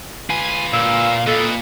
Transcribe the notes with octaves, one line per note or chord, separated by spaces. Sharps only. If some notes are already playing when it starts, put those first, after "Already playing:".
F4 B4 G#5
A#2 F5 E6
A#2 A4 B4 D#5